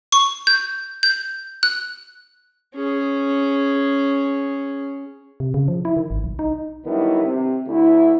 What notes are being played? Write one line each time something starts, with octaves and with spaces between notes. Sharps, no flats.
C#6
G6
G6
F#6
C#4 G#4
C3
C#3
F3
E4
D#3
G#1
B1
D#4
D#3 F#3 G3 B3 D4 E4
C3
D2 E4